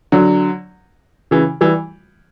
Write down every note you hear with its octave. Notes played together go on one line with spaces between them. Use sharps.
D3 F#3
C#3 E3
E3 G3